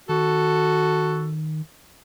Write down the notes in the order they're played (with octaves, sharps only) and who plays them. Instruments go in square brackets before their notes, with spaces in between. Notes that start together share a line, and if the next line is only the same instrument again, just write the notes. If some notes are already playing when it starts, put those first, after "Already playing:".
[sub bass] D#3 [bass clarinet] F#4 [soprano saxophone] A4